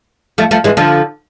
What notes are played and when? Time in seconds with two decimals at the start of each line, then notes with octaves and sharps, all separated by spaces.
0.38 F3 A3
0.51 F3 A3
0.64 E3 G#3
0.77 D3 F3